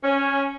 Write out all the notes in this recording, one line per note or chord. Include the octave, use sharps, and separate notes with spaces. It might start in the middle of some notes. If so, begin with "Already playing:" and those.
C#4